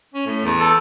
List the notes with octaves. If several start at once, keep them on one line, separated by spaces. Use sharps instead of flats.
C#4
A2
E2
A4